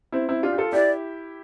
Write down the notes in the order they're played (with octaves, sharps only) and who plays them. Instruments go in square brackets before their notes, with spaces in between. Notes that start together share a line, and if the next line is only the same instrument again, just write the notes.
[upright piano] C4 E4
C4 E4
D4 F4
G4
F4 A4
[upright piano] E4 G4 [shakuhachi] D5